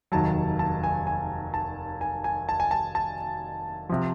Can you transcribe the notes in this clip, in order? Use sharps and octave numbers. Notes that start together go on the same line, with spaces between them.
F1 D#2 D#3 F#3 A5
A5
G#5
G#5
A5
G#5
G#5
A5
G#5
A5
A5
C3 F3